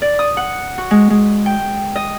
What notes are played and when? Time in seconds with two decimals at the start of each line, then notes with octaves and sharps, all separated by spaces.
0.02 D5
0.19 D#6
0.37 F#5
0.78 F#4
0.91 G#3
1.10 G#3
1.46 G5
1.96 D#5